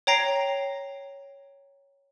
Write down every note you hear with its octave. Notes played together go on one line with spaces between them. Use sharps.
C#5 G5 A#5 A#6 C7